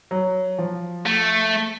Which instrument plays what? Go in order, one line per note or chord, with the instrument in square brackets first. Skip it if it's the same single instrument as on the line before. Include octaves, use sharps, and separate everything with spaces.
[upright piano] F#3
F3
[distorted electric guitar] A3